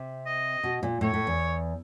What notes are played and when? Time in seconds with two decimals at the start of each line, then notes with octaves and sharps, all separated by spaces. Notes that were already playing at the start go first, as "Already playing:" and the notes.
Already playing: C3
0.26 D#5
0.64 B2
0.83 A#2
1.01 A2 C#5
1.14 A2
1.27 E2